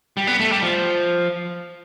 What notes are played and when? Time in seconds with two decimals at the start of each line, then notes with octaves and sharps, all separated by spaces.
0.17 G3
0.27 B3
0.40 A3
0.51 G3
0.62 F3